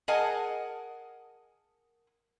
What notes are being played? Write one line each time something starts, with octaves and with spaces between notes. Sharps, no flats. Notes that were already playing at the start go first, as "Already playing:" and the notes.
G#4 A#4 D#5 F#5 G#5 A5